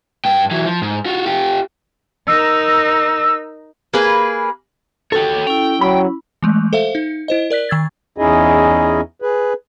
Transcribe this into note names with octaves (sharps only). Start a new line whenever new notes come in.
G2 G5
E3 F#3
F3
G#2
F4 F#4
F4 G4
D#4 A#4 E6
A#3 G#4 B4
F#4 G4 A4 C#5
C#4 E4 G5
F#3 B5
E3 G#3 A3
A4 C5 E5 F5
D#4
E4 C5 D#5
A#4 D5 F#6 B6
D#3 E6 G#6 A6
E2 C#4 D#4 E4 G#4 D#5
G#4 B4